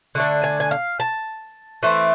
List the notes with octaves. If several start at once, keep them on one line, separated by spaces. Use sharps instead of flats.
D3 A3 D4
G#5
G#5
F5
A5
E3 A3 C4